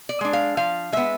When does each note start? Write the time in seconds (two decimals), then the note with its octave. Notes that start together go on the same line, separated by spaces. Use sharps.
0.09 D5
0.21 G#3 D4
0.33 F5
0.57 F3 F5
0.92 G#3 B3 E5